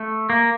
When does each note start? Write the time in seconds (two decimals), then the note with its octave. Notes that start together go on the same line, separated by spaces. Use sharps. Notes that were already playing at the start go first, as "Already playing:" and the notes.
Already playing: A3
0.30 A#3